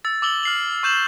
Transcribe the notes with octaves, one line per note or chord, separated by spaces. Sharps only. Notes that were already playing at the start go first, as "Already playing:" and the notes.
E6 A6
D6 E6 F#7 G7
F6 C7 F#7
C#6 G6 E7 F#7